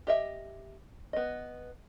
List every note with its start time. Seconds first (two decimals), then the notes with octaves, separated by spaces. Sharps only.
0.07 G4 D#5 E5
1.13 B3 D#5